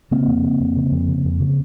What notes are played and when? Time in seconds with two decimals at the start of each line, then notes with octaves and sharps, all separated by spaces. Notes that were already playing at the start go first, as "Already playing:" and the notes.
0.11 C#3 A#3 C4
0.27 F2
0.44 C#3
0.60 F2
0.76 C#3
0.92 F2
1.08 C#3
1.25 F2
1.40 C#3